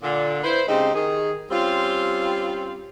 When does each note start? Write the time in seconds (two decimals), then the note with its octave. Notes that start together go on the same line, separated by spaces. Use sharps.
0.02 A#2 D3
0.44 E4 B4 C5
0.68 C#3 G#3 C4 D#4 G4
0.94 D#3 G#4
1.51 G3 C4 C#4 F4